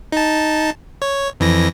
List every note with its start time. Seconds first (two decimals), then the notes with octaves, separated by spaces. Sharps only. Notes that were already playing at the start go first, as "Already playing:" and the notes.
0.12 D#4 A5
1.02 C#5
1.40 F2 E3 A#6